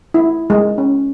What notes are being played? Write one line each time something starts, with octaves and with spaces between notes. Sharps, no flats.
E4
G#3
C#4